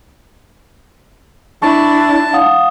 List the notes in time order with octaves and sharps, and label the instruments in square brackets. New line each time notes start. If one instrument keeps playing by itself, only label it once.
[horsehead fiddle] D4 E4 [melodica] A5 [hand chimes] C#6
[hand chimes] F5 F#5 D#6